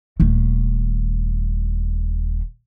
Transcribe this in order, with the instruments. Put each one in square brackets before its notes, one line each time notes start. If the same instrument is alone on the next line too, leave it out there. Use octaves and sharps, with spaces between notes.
[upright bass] D#1 A3